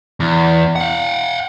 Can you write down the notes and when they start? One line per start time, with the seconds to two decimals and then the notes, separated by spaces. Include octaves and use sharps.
0.20 E2
0.76 F5 F#5